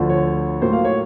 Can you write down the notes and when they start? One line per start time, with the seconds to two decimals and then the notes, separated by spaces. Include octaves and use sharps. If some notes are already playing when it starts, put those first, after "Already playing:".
Already playing: D2 D3 F3
0.09 C#5
0.61 A2 F#3 A#3 C5
0.73 F5
0.85 C#5